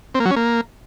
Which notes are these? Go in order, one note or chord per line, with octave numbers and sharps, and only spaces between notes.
C4
A#3
F#3
C#4
A#3